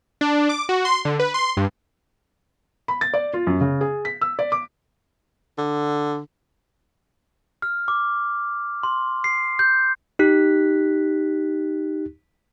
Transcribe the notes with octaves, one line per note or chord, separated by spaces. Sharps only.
D4
D6
F#4
C6
D3
B4
C6
G2
B5
A6
D5
F4
F#2
C#3
G#4
B6
E6
D5
D6
D3
F6
D6
C6
C7
G6
D#4 G4 F#6 B6